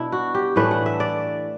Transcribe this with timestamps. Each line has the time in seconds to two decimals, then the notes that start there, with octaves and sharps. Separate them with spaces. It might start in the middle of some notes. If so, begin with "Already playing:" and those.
Already playing: B2 D4 E4
0.12 F#4
0.35 G4
0.56 A2 E3 A3 D4 B4
0.71 F#5
0.86 E5
1.00 D5